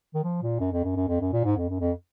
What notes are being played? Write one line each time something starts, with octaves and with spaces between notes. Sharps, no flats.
D#3
F3
A#2
F#2
F2
F#2
F#2
F2
F#2
A#2
G#2
F2
F#2
F2